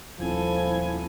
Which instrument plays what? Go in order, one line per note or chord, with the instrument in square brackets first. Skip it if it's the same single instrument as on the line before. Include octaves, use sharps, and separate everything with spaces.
[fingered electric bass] D#1 C4 [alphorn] F3 [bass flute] E4 [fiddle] A4 G#5